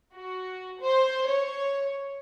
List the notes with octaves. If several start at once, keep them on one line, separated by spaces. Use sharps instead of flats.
F#4
C5
C#5